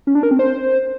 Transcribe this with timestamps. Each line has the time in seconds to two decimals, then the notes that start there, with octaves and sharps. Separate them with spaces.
0.07 C#4
0.15 D4
0.23 A#4
0.31 C4
0.39 C5